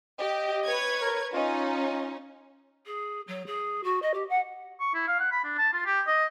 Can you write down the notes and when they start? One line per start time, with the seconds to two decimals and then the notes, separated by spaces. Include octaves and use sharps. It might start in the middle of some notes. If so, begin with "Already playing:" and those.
0.19 G4 D#5
0.65 B4 C#5 G#6
1.01 A#4
1.34 C#4 D#4 F4
2.86 G#4
3.27 F#3
3.46 G#4
3.84 F#4
4.02 D#5
4.14 G4
4.29 F#5
4.80 C#6
4.94 E4
5.08 F5
5.20 F#5
5.32 B5
5.44 D4
5.58 A5
5.73 F4
5.86 G4
6.07 D#5